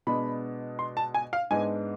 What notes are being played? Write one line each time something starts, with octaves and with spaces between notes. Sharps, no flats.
B2 G#3 B3 D4 B5
C6
A5
G#5
F5
G#2 G#3 B3 D4 G#5